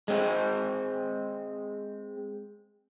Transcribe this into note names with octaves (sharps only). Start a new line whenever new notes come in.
G#3 C4